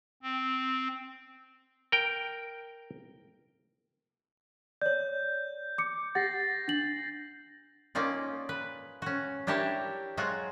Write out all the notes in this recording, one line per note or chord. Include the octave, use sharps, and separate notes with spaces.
C4
A#4 G5
C#5 D5 G6
D6 C#7
G4 F#5 A6 A#6 C7
D4 F#7
A#3 C#4 D#4 F4 D5
B4
C#4 F#4
D4 E4 G4 A#4 C#5 A5
F#3 G#3 F4 F#4